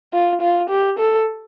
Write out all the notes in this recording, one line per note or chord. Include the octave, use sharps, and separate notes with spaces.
F4
F4
G4
A4